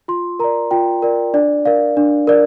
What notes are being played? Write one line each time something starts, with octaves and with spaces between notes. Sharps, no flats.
F4 C6
A#4 D5 A#5
F4 G5
A#4 D5
D4 D5
A#4 D5 F5
D4
A#4 D5